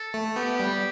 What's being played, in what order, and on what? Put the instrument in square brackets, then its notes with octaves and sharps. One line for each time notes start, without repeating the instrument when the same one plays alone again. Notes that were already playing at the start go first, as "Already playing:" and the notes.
Already playing: [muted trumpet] A4
[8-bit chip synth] A3
[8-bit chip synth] B3 [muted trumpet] G4
[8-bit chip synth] G3